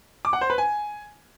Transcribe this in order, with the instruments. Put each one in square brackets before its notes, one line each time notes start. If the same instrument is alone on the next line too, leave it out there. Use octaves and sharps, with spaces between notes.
[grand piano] D6
F#5
C5
B4
G#5